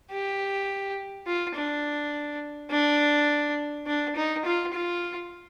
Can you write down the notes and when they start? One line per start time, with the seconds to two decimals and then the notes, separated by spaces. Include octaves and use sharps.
0.11 G4
1.27 F4
1.56 D4
2.70 D4
3.87 D4
4.16 D#4
4.45 F4
4.74 F4